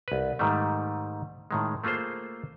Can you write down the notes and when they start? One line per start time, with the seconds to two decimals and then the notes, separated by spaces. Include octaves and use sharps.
0.08 C2 B4
0.39 G#2 D#3 G3 A3
1.51 A2 D#3 G#3
1.84 A3 A#3 F4 G#4 C5